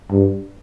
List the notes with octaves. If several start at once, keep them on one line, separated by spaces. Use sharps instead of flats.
G2